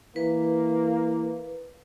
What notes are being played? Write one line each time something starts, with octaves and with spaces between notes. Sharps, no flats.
E3 A#3 B4